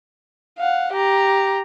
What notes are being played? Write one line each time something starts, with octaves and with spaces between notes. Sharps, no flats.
F5 F#5
G4 A#5